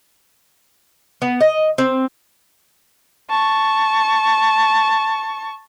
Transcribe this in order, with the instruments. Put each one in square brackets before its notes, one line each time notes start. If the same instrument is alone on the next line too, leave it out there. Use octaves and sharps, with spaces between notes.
[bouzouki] B3
D#5
C4
[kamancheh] A5 C#6